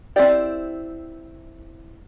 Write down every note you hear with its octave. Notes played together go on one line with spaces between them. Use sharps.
C4 E4 G4 D5